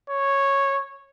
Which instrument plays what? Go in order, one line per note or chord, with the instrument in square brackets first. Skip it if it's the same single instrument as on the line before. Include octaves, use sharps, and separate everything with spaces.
[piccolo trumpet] C#5